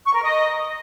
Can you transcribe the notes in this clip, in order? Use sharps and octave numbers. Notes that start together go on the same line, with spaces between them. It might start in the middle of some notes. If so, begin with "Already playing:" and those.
C#6
A#4
D#5